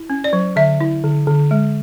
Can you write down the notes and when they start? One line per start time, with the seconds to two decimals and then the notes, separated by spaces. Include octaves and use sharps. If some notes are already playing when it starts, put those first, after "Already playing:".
Already playing: E4
0.10 C#4
0.24 D5
0.33 F#3
0.56 D3 E5
0.81 E4
1.04 D3
1.27 D3
1.51 G#3